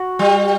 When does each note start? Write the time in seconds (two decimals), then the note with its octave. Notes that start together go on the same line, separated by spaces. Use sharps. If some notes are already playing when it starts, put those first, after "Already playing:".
Already playing: F#4
0.19 G3